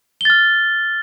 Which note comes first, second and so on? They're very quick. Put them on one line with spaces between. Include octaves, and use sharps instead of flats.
G7 A6 F6